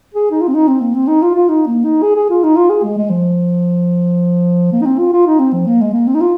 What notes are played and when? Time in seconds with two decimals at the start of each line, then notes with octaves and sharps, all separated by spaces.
0.14 G#4
0.31 D#4
0.41 F4
0.47 C4
0.54 D#4
0.67 C4
0.81 A#3
0.94 C4
1.08 D#4
1.22 F4
1.35 F4
1.49 D#4
1.67 A#3
1.84 D#4
2.02 G#4
2.16 G#4
2.30 F4
2.43 D#4
2.56 F4
2.69 G#4
2.83 G#3
2.97 G#3
3.10 F3
4.72 A#3
4.81 D#4
4.85 C4
4.99 F4
5.13 F4
5.27 D#4
5.39 C4
5.53 F3
5.66 A#3
5.81 G#3
5.93 A#3
6.07 C4
6.14 D#4
6.21 F4